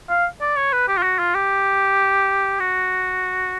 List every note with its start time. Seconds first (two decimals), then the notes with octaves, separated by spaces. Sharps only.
0.09 F5
0.42 D5
0.57 C#5
0.73 B4
0.88 G4
0.97 F4
1.03 F#4
1.19 F4
1.35 G4
2.60 F#4